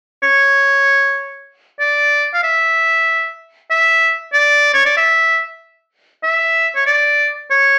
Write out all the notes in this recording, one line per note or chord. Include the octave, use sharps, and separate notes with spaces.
C#5
D5
F5
E5
E5
D5
C#5
D5
E5
E5
C#5
D5
C#5